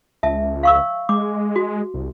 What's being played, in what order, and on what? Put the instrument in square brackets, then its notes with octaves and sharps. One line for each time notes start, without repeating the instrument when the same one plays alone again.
[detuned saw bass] C#2 [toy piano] E5 A5
[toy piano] F5 C#6 E6
[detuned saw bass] G#3 [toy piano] D6
[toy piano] F#4
[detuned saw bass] C2